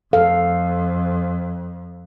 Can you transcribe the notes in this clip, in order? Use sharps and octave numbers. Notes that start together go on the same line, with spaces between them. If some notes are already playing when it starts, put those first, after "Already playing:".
F2 A4 F5